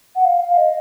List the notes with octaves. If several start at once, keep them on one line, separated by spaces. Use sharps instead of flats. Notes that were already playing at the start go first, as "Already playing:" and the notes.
F#5
F5
F5
D#5